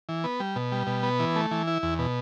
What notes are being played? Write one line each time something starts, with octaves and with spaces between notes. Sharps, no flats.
E3
B3
G3
B2
G3
B2
B3
E3
A3
E3
E4
E2
B2